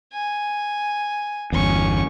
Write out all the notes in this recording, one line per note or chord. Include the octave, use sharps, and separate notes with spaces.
G#5
G1 E2 C#4 C#6